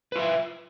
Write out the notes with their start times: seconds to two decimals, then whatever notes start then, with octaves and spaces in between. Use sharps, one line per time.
0.12 B4
0.16 F4
0.19 E5